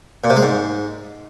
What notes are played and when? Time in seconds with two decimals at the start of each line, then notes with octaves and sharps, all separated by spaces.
0.24 A#2
0.30 C3
0.36 G#3
0.43 G#2